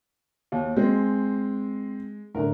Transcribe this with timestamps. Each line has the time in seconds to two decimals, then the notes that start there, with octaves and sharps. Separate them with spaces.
0.52 D#2
0.77 G#3 C4
2.35 A2 D3 A#4